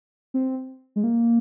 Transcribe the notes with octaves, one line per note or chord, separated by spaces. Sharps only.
C4
G#3
A#3